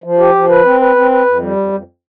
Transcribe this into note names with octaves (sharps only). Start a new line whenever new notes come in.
F3
G4
F3
B4
C4
B4
C4
B4
F2
G3
F2
F2